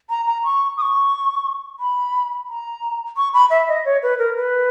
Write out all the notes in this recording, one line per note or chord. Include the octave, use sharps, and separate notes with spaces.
A#5
A#5
C#6
D#6
C#6
B5
A#5
C#6
B5
E5
D#5
C#5
B4
A#4
B4